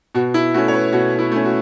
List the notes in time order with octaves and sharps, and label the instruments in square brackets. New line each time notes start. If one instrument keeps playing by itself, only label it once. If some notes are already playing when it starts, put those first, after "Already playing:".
[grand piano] B2 F#4
E4
A3 C#4 F#4
C#5
B4
B2 F#4
E4
A3 C#4
F#4